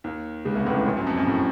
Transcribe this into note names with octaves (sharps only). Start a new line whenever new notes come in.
D#2 D#3
C#2 C#3
C2 C3
A1 A2
A#1 A#2
F#2
F2
F#2
A2